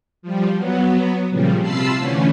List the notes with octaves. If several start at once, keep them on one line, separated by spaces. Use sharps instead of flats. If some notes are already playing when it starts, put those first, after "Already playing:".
F3 G3
F#3 B3
A#2 C#3 F3 G3
C3 F4 A5 B5 E6 C7
D3 E3 A3 C#4